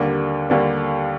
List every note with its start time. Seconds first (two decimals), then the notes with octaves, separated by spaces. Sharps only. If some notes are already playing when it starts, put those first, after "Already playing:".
Already playing: D#2 D3 G3 A#3 D4
0.49 D#2 D3 G3 A#3 D4